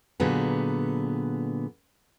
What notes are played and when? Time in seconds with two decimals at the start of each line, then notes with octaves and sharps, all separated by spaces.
0.20 A#2 D3 F#3 B3 G#4 B4